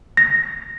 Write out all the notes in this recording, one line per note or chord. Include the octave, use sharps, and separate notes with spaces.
A#6